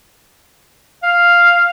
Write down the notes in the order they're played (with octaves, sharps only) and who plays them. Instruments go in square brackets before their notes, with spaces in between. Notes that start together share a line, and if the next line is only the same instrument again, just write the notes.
[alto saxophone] F5